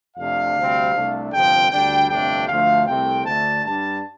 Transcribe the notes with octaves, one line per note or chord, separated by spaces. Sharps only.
F2 C3 A3 D4 F5
D2 C3 G3 C4
C2 C3 A3 D4
G1 F2 C3 F3 G5
D2 D3 G3 D4 G5
G1 F2 C3 A3 D4 G5
D2 D3 F3 A3 F5
C2 C3 A3 C4 G5
D2 D3 A3 D4 A5
G2 G3 D4 A5